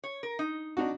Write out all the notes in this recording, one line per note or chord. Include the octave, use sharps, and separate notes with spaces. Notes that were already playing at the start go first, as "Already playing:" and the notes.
C#5
A#4
D#4
D4 D#4 F#4